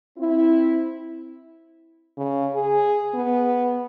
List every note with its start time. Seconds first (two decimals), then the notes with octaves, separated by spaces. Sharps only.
0.18 C4 E4
2.17 C#3
2.54 G#4
3.14 B3